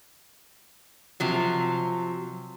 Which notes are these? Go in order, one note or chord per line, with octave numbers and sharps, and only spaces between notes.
C3 F3 F#3